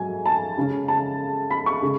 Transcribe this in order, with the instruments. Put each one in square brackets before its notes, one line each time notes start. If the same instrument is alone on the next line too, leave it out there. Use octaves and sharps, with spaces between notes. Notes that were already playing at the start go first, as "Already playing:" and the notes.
Already playing: [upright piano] G#2 F#3 G#5
A5
C#3 G#3 C#4
A5
B5
C#6
C#3 G#3